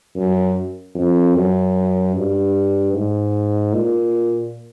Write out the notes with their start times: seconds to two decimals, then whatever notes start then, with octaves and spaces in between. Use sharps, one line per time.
0.15 F#2
0.95 F2
1.35 F#2
2.15 G2
2.94 G#2
3.73 A#2